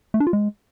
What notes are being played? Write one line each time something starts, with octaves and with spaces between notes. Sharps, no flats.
A3
D4
F4
G#3